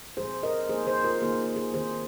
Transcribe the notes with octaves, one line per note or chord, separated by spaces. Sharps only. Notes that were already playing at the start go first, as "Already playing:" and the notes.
A#2 F3 G#3 C4 G#4 C5
A#4 D#5
F3 A#3 D#4 G#4 C5
G#4 C5
F4 A#4
D#3 A#3 D#4 G#4
G#4
F4
G#4
D#3 C4 D#4 G#4 C5